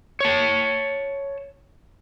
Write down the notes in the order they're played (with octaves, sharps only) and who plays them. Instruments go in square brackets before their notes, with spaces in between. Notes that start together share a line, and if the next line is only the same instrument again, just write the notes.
[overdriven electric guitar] C#5 A5